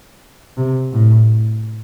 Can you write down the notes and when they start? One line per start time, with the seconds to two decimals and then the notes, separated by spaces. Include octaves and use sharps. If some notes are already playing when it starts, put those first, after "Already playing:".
0.57 C3
0.92 A2